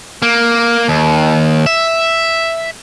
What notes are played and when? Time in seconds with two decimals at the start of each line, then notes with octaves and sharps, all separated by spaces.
0.22 A#3
0.88 D#2
1.66 E5